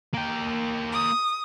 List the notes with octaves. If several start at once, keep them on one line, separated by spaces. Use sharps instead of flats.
A#3 G5
D#6